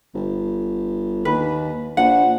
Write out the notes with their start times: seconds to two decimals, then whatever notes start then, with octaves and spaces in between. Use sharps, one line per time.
0.14 G1
1.25 D#2 B4
1.97 A#1 F#5